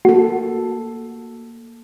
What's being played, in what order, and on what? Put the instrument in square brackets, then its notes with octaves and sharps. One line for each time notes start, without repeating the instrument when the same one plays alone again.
[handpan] A#3 A4 [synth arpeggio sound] F#4